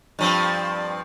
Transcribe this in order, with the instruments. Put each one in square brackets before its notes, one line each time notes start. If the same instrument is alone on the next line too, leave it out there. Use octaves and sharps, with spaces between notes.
[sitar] G2 F3 C4